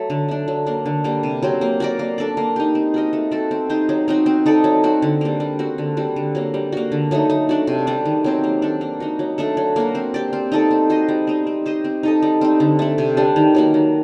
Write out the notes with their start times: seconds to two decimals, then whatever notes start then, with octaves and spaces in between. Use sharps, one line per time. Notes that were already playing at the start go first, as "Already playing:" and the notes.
Already playing: F#3 A3
0.10 D3
0.29 A3 D4
0.48 F#3
0.66 A#3 D4
0.86 D3
1.04 G3 A#3
1.23 C3
1.42 F#3 C4 G4
1.61 A#3
1.80 F#4 A#4 D5
1.99 A#3
2.18 D4 A4 D5
2.37 A#3
2.56 D#4 G4
2.75 C4
2.94 F#4 A#4 D#5
3.13 A3
3.31 C4 F#4 A4
3.51 C4
3.70 D#4 G4 C5
3.89 F#3
4.08 C4 D#4 F#4
4.26 C4
4.46 D#4 A4 D5
4.64 F#3
4.84 C4 F#4
5.02 D3
5.21 G3 A#3
5.40 G3
5.59 C4 F#4
5.78 D3
5.97 G3 C4 F#4
6.16 D3
6.35 F#3 A#3
6.54 G3
6.72 A#3 F#4
6.92 D3
7.11 F#3 A3 D#4
7.30 A3
7.49 D4 F#4
7.67 C3
7.87 G3 D4
8.06 D#3
8.24 F#3 C4 G4
8.44 A#3
8.62 D4 A4
8.81 A#3
9.00 D#4 F#4
9.19 F#3
9.38 A3 D4 A4
9.57 F#3
9.76 A#3 F#4
9.95 C4
10.14 G4 D5
10.33 C4
10.52 D#4 A4 D5
10.71 C4
10.90 F#4 C5 D#5
11.09 G3
11.27 C4 D#4
11.47 C4
11.66 G4 C5 D#5
11.84 C4
12.03 D#4 A4 D#5
12.22 G3
12.41 C4 D#4
12.60 D3
12.79 A3 D4
12.98 C3
13.17 G3 D4 G4
13.36 D#3
13.55 F#3 A#3 F#4
13.74 D#3